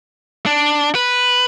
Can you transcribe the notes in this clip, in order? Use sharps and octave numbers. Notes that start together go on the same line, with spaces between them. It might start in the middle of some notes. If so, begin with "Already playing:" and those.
D4
B4